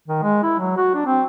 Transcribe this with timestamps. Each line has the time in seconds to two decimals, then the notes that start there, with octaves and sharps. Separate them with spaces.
0.08 D#3
0.23 G#3
0.43 E4
0.59 F#3
0.77 F#4
0.95 D4
1.06 C4